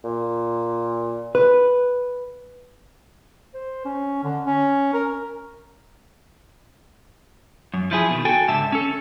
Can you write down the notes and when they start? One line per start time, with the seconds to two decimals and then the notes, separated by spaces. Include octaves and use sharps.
0.04 A#2
1.35 B4
3.54 C5
3.85 C#4
4.24 D3
4.46 C#4
4.93 A#4
7.74 F#2
7.91 F3 E4 G#4
8.09 B2 D#3
8.25 F#4 A4 G5 G#5
8.48 C#2 G#2 D3 E5 A5
8.72 C#4 A4